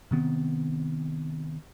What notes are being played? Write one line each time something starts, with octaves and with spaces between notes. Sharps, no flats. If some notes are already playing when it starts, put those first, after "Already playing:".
C3 D#3 B3 C4